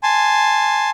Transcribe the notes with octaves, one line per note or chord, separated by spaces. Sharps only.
G#5 A5 C6